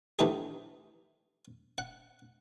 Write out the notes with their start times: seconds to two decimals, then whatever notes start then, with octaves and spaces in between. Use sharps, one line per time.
0.19 A#1 E3 A3 D#4 G4 G#4
1.78 F#5